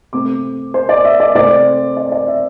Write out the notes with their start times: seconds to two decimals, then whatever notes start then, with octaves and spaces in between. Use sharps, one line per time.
0.13 C3 A3 C4 D6
0.74 C5
0.89 D5
1.05 E5
1.20 D5
1.35 C3 A3 C4 D5
1.97 D5
2.12 D5
2.28 E5